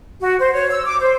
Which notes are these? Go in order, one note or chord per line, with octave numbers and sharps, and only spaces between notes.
F#4
C5
C#5
E6
D6
C5